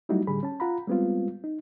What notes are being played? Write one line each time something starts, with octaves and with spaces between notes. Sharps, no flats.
F#3 G3 A3 D#4 E4 F#4
A2 D3 G3 G#4 B5
C#4 A5
F4 F#5 A#5 B5
G3 G#3 B3 C4 F4
D#4